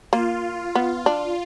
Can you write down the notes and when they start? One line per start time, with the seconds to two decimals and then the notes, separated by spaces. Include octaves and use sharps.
0.13 A#3 F4
0.75 B3
1.06 D4